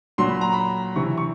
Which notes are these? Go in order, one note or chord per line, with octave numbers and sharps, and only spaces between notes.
A#2 F#3 C6
B5
A#5
B5
C3 E3 C#6
C#6